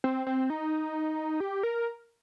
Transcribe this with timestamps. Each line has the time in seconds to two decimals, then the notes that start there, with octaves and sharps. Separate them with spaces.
0.04 C4
0.27 C4
0.50 D#4
1.40 G4
1.63 A#4